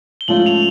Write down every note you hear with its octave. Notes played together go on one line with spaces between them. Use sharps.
G7
G#2 F3 A3 C#4 F4 F#7
F7